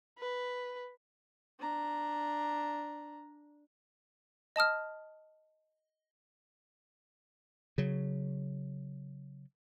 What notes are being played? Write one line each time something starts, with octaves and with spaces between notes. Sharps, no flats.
B4
D4 A#5
D#5 A5 D#6 F6
C#3 F#3